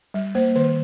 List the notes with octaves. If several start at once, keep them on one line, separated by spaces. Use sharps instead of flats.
G3
A#3 C5
D#3 C5